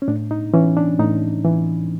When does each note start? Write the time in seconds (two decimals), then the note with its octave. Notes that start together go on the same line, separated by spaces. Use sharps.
0.02 C#4
0.08 A2 D4
0.31 D#4
0.54 E3 C#4
0.77 D4
0.99 A2 D#4
1.45 E3